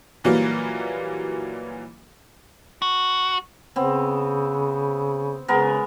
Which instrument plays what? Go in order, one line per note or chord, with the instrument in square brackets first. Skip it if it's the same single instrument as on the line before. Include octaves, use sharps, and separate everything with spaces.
[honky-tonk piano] A#2 E3 F#3 G3 A#3
[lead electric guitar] F#4
[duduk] C#3 [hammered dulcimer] B3 C4
[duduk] C#3 [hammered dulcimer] G#3 B3 A#4